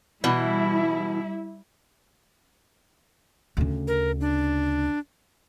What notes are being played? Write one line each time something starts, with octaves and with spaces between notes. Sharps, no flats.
B2 E3 G3 E4
D2 C#3
A#4
D4